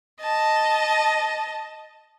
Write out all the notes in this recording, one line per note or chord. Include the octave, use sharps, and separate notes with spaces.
D#5 A5